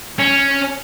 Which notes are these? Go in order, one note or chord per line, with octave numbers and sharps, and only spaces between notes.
C#4